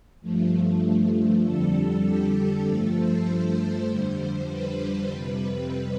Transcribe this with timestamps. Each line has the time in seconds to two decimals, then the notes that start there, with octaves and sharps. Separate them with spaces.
0.21 G2 F3 A3
1.43 F2 D3 G3 A4
2.05 G4
2.65 G2 F3 A3 A4
2.96 C5
3.27 C5
3.87 F2 D3 G3 C5
4.18 C5
4.48 B4
5.09 F2 C3 G3